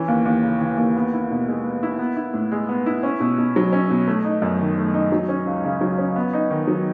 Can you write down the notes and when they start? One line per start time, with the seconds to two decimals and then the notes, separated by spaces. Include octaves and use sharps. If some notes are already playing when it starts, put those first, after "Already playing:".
Already playing: E3 C#4
0.08 D#2
0.25 D#2
0.43 C#3
0.61 E3
0.78 D#2
0.96 B3
1.13 E4
1.30 B2
1.48 G#3
1.64 B3
1.83 E4
1.99 B3
2.17 E4
2.34 A2
2.52 G#3
2.69 B3
2.86 E4
3.03 C#4
3.20 B2
3.38 B2
3.56 F#3
3.73 C#4
3.90 B2
4.08 A3
4.25 D#4
4.42 F#2
4.59 D#3
4.78 A3
4.94 D#4
5.12 F#3
5.29 C#4
5.47 C#2
5.64 C#3
5.81 F#3
5.98 C#4
6.16 B3
6.34 D#4
6.51 D#3
6.67 F#3